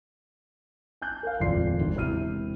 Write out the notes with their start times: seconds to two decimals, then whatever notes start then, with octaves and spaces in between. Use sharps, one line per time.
1.02 G#5 A5 F#6 G6
1.23 A#4 F5
1.40 D#1 G#1 F2 D5 C6 C7
1.81 G#1
1.95 E1 C3 E4 F6 D#7